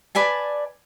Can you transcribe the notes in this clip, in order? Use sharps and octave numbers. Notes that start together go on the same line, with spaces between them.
B4 D5 G#5 A5